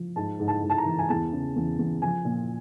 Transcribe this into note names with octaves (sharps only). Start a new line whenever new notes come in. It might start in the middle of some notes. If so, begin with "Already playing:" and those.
Already playing: F3
G#2 A5
G#2
A5
G#2
A5
A#5
E3
G#5
E2 A5
C#3
E2
E2
F3 G#5
A#2